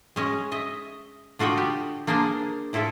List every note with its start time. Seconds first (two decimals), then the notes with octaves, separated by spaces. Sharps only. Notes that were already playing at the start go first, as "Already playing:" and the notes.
0.16 G#3 C#4 D#5
0.52 D#5 E5
1.39 D3 F4 F#4 D#5 G5
1.57 G4
2.07 A#3 D4 G#4 A#4 C5
2.73 A2 E4 F4 A4 E5